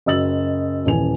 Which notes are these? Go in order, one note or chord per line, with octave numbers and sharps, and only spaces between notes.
F#1 F#3 D#5 E6 A6 F#7
D#1 E3 G#5 F7